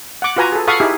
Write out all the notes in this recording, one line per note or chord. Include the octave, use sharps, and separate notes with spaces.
F#5 D6
F4 F#4 B4 G#5 A#5
G#4 A4
A4 F5 F#5 B5 C#6 D#6
D#4 E4 G4 G#4